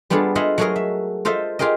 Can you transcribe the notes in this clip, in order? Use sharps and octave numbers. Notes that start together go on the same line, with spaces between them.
G3 B3 D4 F4 G#4 A4
F4 G#4 D#5 E5 F#5
F#3 A3 F#4 G#4 A#4 D#5
E5
F4 A4 C5 D#5 E5
F4 G4 G#4 A#4 D#5